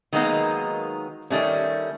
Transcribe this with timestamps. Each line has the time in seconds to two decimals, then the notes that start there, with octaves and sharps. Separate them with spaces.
0.13 D#3 F#3 G#3 A#3 B3 D#4
1.30 D#3 G3 A3 C#4